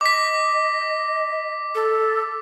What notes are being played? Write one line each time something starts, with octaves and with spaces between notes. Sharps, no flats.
D#5 D6 B6
A4